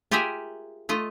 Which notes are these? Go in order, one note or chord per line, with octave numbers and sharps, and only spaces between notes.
F4 G4 G#4 A#4 E5 G#5
A3 F4 D#5